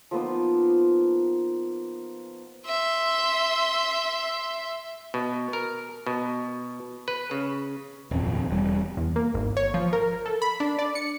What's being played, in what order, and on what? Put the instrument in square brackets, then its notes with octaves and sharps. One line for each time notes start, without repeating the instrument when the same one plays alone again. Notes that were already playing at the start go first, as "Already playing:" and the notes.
[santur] F3 A#3 B3 D#4
[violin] E5 C6
[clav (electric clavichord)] B2
A#4
B2
B4
C#3
[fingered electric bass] D#1 G#1 F2 C4
E1 G3
[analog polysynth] E2
A#3
G#1
C#5
F3
A#4
A4
B5
D4
D5
C#7